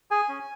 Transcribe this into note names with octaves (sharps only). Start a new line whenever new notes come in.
G#4 G#5
C#4